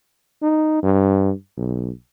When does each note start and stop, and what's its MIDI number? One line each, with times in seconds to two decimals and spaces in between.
0.42 0.81 63
0.83 1.31 43
1.57 1.91 35